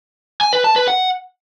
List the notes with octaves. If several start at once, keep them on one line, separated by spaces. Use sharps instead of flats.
G#5
B4
A5
B4
F#5